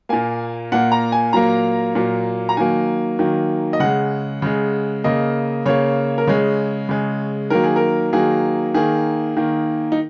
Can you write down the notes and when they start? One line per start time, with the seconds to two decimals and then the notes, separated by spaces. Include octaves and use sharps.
0.09 A#2 A#3 G#5
0.72 A#2 A#3 F#5
0.92 A#5
1.12 G#5
1.33 A#2 F#3 A#3 A#5
1.95 A#2 F#3 A#3
2.49 A#5
2.57 D#3 F#3 A#3 G#5
3.19 D#3 F#3 A#3
3.73 D#5
3.80 C#3 G#3 F#5
4.42 C#3 G#3
5.04 C#3 A#3 D#5
5.66 C#3 A#3 C#5
6.18 A#4
6.27 C#3 G#3 C#5
6.89 C#3 G#3
7.50 D#3 F#3 A#3 A#4
7.64 G#4
7.76 A#4
8.13 D#3 F#3 A#3 G#4
8.74 D#3 A#3 G#4
9.37 D#3 A#3
9.92 D#4